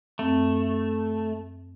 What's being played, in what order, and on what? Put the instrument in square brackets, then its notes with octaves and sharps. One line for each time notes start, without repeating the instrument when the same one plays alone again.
[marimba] F#2 C4 [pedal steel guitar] A3